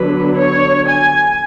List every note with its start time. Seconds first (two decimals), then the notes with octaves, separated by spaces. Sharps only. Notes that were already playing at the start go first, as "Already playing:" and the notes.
Already playing: D3 F#3 B3 D4 B4
0.35 C#5
0.86 G#5